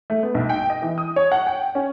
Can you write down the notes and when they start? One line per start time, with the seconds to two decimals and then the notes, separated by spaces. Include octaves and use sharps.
0.10 A3
0.23 B3
0.35 B1
0.49 G5
0.70 D#5
0.82 E3
0.98 D#6
1.16 C#5
1.32 F#5
1.47 G5
1.75 C#4